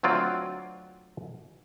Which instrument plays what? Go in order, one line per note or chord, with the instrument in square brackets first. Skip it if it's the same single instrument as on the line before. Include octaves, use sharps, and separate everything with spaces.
[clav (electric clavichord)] D2 F#3 C4 F4 D5